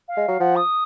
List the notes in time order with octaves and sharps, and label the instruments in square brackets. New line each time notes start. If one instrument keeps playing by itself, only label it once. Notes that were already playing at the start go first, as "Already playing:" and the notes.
[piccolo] F5
[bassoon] G#3
F#3
[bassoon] F3 [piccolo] F#5
[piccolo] D#6